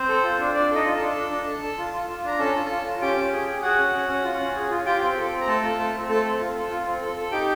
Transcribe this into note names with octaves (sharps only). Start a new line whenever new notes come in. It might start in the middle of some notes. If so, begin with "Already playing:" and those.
Already playing: C4 C5
A4
F4
D4
D4 D5
D#4 A4 D#5
F4
A4 A5
D4
D4
D4
A4
A4
F4
F4
F4
D4 A#5
C#4 A4 A5
F4
F4
F4
C#4 G4 G5
C#4
G#4
G#4
F#4 G#4 F#5
C#4
C#4
C#4
F4
C#4
G#4
F4
F4 G4 G5
C4
A4
C4
A#5
A3 A4 A5
F4
A3
C4
A3 A4 A5
C4
F4
A4
F4
C4
A4
A4
D#4 G4 G5